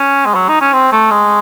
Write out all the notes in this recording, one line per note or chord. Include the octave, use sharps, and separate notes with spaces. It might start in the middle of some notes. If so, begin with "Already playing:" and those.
Already playing: C#4
G#3
F#3
D#4
C#4
C4
A3
G#3